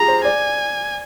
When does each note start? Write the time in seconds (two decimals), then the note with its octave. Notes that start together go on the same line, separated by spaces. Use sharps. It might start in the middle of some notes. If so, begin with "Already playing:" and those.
Already playing: F4 G4 G#4 A#5
0.08 C5
0.25 D5 G#5